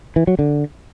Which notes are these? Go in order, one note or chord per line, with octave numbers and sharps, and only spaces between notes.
E3
F#3
D3